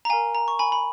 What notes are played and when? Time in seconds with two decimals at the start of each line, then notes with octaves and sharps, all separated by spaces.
0.05 A#5
0.09 A#4 F5 G#5
0.35 A#5
0.48 C#6
0.59 G#5 B5
0.72 B5